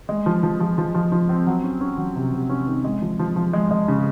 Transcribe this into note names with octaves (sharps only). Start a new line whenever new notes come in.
G#3
F3
F3
F3
F3
F3
F3
C4
F#3
C#4
C#4
F#3
C3
C3
C#4
D#3
G#3
F3
F3
F3
G#3
G#3
C#3